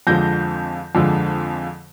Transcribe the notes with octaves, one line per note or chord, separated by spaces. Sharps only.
F2 D3 F3 G#3 G6 A#6
F2 D3 F3 G#3